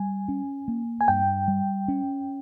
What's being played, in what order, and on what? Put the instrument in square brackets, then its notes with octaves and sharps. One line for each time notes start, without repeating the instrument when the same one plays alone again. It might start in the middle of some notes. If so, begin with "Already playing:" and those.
Already playing: [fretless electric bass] G3 [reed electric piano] G#5
[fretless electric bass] C#4
A#3
[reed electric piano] G#5
[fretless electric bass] G2 [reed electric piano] G5
[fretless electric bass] G3
C#4